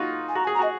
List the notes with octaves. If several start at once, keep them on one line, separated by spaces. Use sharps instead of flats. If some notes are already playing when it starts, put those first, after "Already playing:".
Already playing: D#4 F4 F#4
G#5
F#4 A#5
G#5
G#4
A#5
F#4 D#5